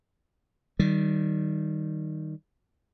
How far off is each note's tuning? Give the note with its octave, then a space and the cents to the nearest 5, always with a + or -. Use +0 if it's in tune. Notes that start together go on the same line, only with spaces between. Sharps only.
D#3 +0 G3 -20